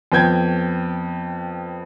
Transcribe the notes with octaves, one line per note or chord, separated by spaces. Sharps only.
F2 B3 G5 G6 G#6